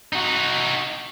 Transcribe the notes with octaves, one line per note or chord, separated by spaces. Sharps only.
D#4 F#4